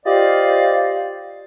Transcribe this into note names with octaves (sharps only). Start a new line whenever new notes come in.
F4 G4 C5 D5 D#5 F5